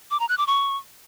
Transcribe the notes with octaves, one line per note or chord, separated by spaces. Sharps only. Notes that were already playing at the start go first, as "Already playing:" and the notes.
D6
A#5
F#6
D6
C#6